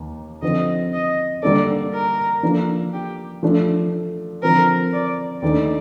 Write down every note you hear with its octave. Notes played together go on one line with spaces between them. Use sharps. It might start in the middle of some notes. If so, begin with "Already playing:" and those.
Already playing: D#2 D#3 A#3
D3 F3 C4 D#5
D#5
D3 G3 A#3 D4 A4 D5
A#4
F3 A#3 D4 A4
G4
F3 A3 D4
D3 F3 C4 A#4
D5
D#2 D#3 A3 D4 D5